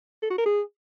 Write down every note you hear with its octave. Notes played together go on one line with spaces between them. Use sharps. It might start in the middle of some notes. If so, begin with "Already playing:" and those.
A4
F#4
A#4
G#4